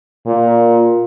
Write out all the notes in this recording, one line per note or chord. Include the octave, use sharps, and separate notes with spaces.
A#2